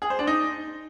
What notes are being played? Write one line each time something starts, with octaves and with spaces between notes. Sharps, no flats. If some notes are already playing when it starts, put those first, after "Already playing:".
G#4
C5
D4
D#4